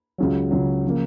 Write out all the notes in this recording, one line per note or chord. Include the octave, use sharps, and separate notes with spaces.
C#2 C#3 F#3
C#2 C#3 F#3
C#3 F3 A#3